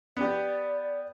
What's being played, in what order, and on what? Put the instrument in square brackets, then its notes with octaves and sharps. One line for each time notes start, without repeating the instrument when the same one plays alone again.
[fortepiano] B3 G4 [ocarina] D5